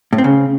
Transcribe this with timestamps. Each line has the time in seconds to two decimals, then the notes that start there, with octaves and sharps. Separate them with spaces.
0.13 A2
0.18 C4
0.24 C#3